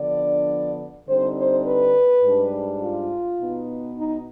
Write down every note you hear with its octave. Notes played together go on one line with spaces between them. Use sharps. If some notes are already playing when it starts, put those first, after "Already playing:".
Already playing: D3 F3 B3 D4 D5
D3 G3 C4 D#4 C5
C5
B4
G#2 G3 D4
F4
B2 B3 D#4
D#4